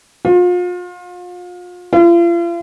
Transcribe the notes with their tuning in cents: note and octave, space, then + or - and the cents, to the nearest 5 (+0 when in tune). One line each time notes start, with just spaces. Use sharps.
F4 +35
F4 -40